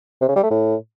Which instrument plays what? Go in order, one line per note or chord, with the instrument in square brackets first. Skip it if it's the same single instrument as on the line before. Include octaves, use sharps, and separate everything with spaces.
[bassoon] C3
C#3
G3
A3
A2